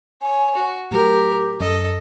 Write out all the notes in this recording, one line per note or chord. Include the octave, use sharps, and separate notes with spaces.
C#5 G#5
F#4
A2 F#3 G4 A#4
F#2 A4 D#5